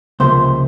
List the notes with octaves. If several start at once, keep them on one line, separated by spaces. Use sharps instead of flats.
C#2 C3 F3 A#3 C5